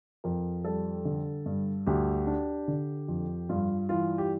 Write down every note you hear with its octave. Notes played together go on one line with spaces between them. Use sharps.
F2 A#4
G3 A4
D3
G2
D2 G4
D4
D3
F2
G2 F4
E3 F4
G4